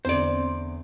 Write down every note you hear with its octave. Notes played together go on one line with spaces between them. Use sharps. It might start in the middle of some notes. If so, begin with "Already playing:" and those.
E2 D3 C4 C5 D5 C6